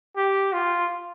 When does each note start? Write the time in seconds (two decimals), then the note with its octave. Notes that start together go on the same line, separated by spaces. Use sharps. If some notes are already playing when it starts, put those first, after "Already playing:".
0.17 G4
0.53 F4